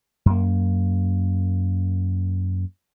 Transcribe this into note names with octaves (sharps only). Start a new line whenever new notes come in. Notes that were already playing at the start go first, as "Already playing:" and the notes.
F#2 A#3